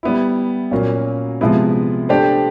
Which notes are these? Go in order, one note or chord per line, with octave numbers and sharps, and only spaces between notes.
G3 B3 E4
A#2 F#3 A#3 C#4
C3 F3 G#3 B3 E4
A3 D4 G4 C5